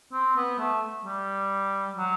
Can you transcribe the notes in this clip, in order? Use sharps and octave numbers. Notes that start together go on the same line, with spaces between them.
C4
B3
A3
G3
F#3